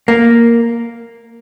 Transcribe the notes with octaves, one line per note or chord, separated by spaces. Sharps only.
A#3